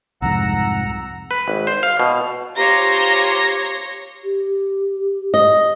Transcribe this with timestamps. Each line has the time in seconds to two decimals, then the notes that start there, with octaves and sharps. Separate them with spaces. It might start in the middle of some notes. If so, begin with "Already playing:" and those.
0.22 C2 F2 G#2 F#5 A#5 E6
1.31 B4
1.48 G#1
1.67 C5
1.83 F5
2.00 B2
2.56 F4 G4 C5 C#5 A#5 C6 A#6
4.24 G4
5.34 D#5